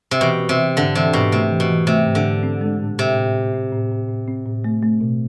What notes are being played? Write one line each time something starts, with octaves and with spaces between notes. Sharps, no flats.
C3
B2 E3
C4
C3
E3
G#2 D3
C3 E3
G#2 B2
C3 A3
E3
B2
E3
C3 A3
G#2
D3
G#2
C4
G#3
A2
A2 C3
A2
A2
C4
A2
A2
A2
C4
A2
A3
A3
B2